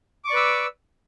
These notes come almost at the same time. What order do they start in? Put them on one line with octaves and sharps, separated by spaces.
D6 C#6 D5 B4 E6